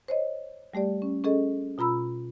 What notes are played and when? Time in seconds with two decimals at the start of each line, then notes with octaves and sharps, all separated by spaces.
0.08 C5 C#5 D#5
0.74 G3 A3 G4 D5
1.02 C#4
1.24 C#4 G#4 A4 D#5
1.78 B2 F4 A#5 B5 E6